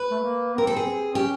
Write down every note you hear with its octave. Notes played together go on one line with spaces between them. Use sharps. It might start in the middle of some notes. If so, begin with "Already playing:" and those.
Already playing: B4
A3
A#3
C4 A#4
A4
G#4
C4
C#4 G4